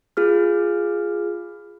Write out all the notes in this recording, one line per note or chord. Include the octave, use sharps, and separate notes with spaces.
F4 G#4 F6